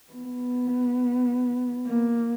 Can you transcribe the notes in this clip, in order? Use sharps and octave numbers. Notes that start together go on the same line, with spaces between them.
B3
A#3